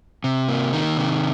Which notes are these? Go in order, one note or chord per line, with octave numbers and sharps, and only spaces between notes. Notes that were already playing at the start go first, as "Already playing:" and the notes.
C3
A#3
D#3
C3